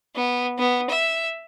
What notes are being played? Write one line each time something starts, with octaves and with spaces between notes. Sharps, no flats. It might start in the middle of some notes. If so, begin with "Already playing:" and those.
B3
B3
E5